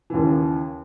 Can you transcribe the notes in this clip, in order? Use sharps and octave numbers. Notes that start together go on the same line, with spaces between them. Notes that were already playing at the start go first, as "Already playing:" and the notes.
D#2 C#3 E3